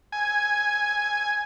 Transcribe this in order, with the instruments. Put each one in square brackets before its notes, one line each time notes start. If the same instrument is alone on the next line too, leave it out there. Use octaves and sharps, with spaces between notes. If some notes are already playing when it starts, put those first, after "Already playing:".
[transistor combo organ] G#5